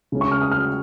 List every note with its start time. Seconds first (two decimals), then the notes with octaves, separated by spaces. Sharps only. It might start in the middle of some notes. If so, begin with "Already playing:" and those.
0.12 C#3 G#3 C#4
0.21 C#6
0.32 F6
0.42 D#6
0.51 F6